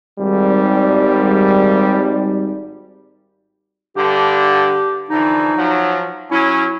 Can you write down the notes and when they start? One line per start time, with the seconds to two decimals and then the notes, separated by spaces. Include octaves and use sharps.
0.20 G#1 G3
3.96 G2 D3 G4
5.10 D3 E3 F3 D#4
5.56 F3 F#3
6.31 F#3 C#4 E4